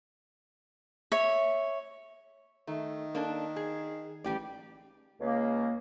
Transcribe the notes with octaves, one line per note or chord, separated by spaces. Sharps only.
C#5 E5
D#3 A3
A#3 D4 A4
G#4
A1 G3 G4 D5
C#2 C#3 A#3